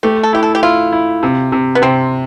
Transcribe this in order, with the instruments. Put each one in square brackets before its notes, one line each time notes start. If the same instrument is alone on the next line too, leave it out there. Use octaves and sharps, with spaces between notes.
[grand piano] A3 [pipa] G4
[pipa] A4
[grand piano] E4 [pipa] G4
[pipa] A4
G4
[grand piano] E4 [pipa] F4
[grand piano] E4
C3
C3
[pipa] B3
[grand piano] C3 [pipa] C4